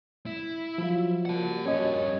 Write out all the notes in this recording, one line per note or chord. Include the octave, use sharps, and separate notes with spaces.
E4
F3 F#3 F4
G3 A#3 F#4 F#5 A5
G2 C#4 G4 C#5 D#5